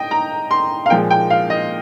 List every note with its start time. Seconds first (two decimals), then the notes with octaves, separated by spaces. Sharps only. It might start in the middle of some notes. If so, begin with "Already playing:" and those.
Already playing: D#5 G5
0.11 A#5
0.51 C6
0.86 F5
0.90 A#2 F3 G#3 G5
1.10 G5
1.30 F5
1.50 D#5